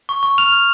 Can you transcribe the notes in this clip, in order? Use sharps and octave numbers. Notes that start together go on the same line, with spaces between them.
C#6
C#6
F6 F7
F6